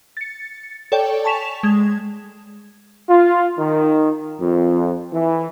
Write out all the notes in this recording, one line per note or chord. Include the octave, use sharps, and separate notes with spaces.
A6 C#7
A4 C#5 D5 G5
G#5 A5 C#6 B6 E7 F7
G#3 G#6
F4
D#3
F2
E3